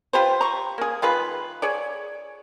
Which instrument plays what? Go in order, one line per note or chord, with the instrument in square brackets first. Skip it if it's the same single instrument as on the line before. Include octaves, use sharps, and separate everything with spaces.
[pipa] F4 G4 B4 C5
A#5 C#6
A#3 G#4
D#3 F4 G#4 B4
G#4 C#5 D5